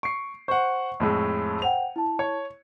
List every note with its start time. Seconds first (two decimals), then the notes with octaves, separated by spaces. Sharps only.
0.03 C#6 C7 D7
0.48 C5 F#5 C#6
1.00 F2 A2 G#3
1.62 C5 F#5 G5 F7
1.96 E4 A5
2.19 C#5